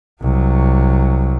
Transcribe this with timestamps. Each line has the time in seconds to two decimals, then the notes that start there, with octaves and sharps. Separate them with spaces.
0.21 C2 F#3